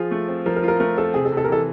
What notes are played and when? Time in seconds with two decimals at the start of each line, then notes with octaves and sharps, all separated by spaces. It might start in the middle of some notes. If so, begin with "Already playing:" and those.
Already playing: F3 F4 G#4
0.11 A3
0.28 C4
0.46 F3 A#4
0.56 A#4
0.63 F4
0.68 A#4
0.80 A3 A#4
0.97 C4 A4
1.14 C3 G#4
1.25 A4
1.32 C3
1.37 A4
1.44 A#4
1.49 E3 A4